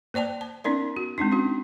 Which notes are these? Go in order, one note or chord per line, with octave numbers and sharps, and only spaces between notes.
A#3 C5 D5 G5 A5
A5
B3 C#4 D#4 A#4 D5
F#4
G#3 C4 D4 D#4
C#4 D#4 F#4